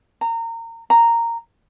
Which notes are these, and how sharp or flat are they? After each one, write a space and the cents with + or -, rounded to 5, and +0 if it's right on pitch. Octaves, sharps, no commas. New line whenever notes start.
A#5 -25
A#5 -10